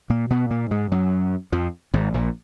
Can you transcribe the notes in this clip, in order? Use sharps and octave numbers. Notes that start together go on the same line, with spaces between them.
A#2 A#3
B2 B3
A#2 A#3
G#2 G#3
F#2 F#3
F2 F3
G#1 G#2
A#1 A#2